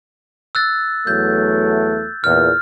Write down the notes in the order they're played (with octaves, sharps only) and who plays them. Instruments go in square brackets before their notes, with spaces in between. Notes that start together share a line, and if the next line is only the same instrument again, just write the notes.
[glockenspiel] E6 F#6 A6
[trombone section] E2 F#3 A3 [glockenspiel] G6
[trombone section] E2 A#2 [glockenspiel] F6